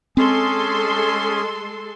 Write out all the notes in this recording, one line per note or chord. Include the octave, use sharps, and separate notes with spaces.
G#3 C4 C#4 G#4 A4 C6